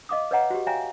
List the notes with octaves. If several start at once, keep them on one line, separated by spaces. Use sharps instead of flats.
D#5 F5 D6 D#6
B4 C#5 D#5 F#5 A#5
F#4 G4
C#5 E5 F5 G5 G#5 A#5